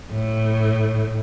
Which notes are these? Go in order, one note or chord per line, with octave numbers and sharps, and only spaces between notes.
A2